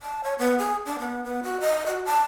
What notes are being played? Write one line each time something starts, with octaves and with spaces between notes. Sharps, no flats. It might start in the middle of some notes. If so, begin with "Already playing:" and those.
A5
C#5
B3
G#4
D4
B3
B3
F#4
D#5
F#4
A5